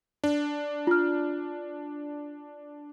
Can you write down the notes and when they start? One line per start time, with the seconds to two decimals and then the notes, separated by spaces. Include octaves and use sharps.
0.24 D4
0.87 F4 F6